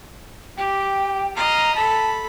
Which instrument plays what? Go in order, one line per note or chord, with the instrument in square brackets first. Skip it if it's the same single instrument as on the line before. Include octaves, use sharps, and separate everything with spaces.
[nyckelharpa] G4 [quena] G5
[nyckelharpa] D#5 F5 [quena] A#5
[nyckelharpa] A4 B5 [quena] A5